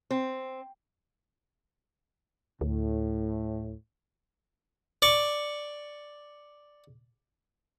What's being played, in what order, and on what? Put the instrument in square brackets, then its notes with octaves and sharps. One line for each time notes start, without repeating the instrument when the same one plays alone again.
[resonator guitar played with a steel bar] C4
[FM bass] D2 [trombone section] A2
[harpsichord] D5 C#6